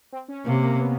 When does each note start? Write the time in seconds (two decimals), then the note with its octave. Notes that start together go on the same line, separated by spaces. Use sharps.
0.12 C4
0.28 C#4
0.46 C3 A#3
0.63 A#3
0.80 B3